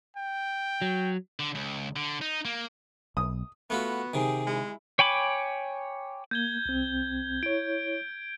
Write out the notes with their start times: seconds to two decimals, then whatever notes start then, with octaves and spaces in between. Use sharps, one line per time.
0.17 G5
0.82 F#3
1.40 D3
1.55 C#2
1.96 D3
2.21 D#4
2.45 A#3
3.17 B1 D#6
3.70 A3 B3 F4 F#4 B5
4.14 C3 D#3 G4 G#4
4.47 G#3 E4
4.99 C#5 G5 G#5 B5 D6
6.31 A#3 G6 G#6 G7
6.66 C2 C4
7.43 E4 C#5 D7